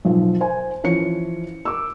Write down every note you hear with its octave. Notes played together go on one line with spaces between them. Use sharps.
B1 F3
C5 G#5
E3 F3 C#4 C#5 C#7
D6 E6